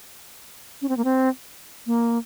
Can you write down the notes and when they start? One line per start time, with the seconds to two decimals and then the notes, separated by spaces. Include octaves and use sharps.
0.82 C#4
0.89 C4
0.97 A#3
1.04 C4
1.86 A#3